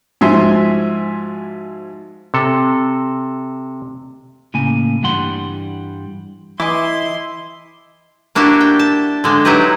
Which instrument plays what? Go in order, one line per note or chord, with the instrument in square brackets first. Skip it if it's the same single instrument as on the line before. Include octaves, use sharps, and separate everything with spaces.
[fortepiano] G#2 F3 F#4 E5 G#5 C6
[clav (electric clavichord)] C3 A4
[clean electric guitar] A2 C#3 A#3 G#5
G2 E3 G3 F#5 C6
[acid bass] E3 [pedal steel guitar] E4 [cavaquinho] D#5 G#5 D6 [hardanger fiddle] C6
[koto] A#3 D4 E4 F#4 G4
G5
A5
D3 G#3 D4
F#3 D#4 E4 G4 B4 A#5